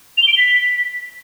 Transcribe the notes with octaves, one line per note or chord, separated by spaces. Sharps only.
F7
G7
D7
G7
B6